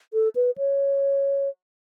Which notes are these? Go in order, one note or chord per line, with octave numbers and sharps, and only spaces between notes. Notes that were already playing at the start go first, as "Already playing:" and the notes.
A4
B4
C#5